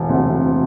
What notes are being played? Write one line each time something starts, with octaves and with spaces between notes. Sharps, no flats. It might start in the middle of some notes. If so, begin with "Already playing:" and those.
Already playing: E1
D2 C3